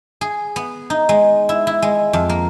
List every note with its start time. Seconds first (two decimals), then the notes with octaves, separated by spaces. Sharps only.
0.21 G#4
0.56 B3
0.90 D#4
1.09 G#3
1.49 E4
1.67 E4
1.82 G#3
2.13 F2
2.29 A#3